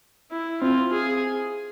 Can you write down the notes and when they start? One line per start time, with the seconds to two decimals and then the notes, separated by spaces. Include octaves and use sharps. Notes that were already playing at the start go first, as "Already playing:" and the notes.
0.31 E4
0.61 C4 F4
0.92 G#4